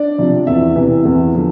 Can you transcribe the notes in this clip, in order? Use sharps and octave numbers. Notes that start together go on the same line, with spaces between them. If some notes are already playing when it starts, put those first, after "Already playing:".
Already playing: D4 D5
C3 F3
E2 E4 E5
C3 E3
E2
D3 F3